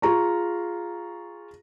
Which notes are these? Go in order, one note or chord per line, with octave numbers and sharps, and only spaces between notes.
F4 G#4 A#5 C#6